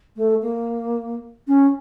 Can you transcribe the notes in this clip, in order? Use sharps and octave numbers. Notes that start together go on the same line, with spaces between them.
A3
A#3
C#4